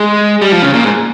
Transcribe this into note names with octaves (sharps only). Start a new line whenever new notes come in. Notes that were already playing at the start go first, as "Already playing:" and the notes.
Already playing: G#3
G3
F3
C#3
A#2
G#2